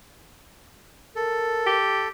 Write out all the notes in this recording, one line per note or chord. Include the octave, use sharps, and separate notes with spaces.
A4 A#4
G4